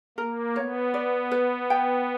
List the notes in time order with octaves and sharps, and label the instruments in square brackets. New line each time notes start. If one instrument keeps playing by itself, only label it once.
[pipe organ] A#3 [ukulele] A#4
[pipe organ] B3 [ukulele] C#5
[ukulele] D5
B4
G5